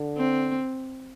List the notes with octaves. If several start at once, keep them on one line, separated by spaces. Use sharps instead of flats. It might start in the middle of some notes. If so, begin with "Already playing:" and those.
Already playing: D3
C4